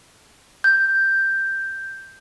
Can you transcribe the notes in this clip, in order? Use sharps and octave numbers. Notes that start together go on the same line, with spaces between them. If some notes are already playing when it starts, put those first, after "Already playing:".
G6